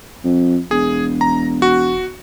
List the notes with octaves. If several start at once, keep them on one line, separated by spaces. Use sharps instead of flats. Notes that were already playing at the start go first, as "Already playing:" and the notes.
F2
E1 G#4
A#5
F#4